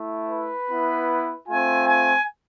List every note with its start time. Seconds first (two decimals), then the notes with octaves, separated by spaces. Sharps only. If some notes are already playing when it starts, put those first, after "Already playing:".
Already playing: A3 E4
0.28 B4
0.68 B3 E4
1.48 A3 C4 F4 G#5
1.87 G#5